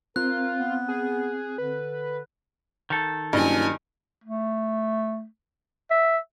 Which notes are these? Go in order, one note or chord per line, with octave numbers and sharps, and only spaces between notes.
C4 F4 A#4 F#6
B3
G#4
D3 B4
D#3 A4
F#1 G2 D#5 G#5
A3
E5